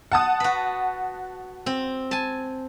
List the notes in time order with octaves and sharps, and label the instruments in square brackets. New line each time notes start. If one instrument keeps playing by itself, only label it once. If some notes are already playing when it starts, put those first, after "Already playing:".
[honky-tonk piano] F#5 A5 D#6
[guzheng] F#4 B4
C4
G#5 A5